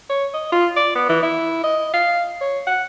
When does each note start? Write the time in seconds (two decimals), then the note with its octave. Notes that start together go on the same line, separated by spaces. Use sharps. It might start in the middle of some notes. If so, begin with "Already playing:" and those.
0.10 C#5
0.34 D#5
0.52 F4
0.76 D5
0.95 B3
1.09 E3
1.23 E4
1.63 D#5
1.94 F5
2.41 C#5
2.67 F#5